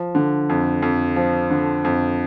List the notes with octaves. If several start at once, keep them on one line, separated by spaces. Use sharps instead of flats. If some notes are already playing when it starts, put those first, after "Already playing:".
Already playing: F3
D3
F2
F2
F3
D3
F2